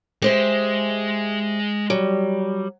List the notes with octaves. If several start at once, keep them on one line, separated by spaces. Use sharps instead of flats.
G#3 G4 C5 E5
F#3 G3